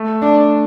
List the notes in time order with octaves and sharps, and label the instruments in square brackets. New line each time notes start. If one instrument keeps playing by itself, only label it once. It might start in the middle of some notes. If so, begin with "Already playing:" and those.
Already playing: [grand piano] A3
[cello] D4